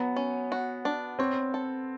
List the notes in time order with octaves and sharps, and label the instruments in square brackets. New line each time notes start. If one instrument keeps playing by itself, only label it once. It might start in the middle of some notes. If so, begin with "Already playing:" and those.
Already playing: [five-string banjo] F#3 [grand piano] B3
[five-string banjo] C#4
F#4
D4
[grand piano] C4 [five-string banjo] C#5
[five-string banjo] A4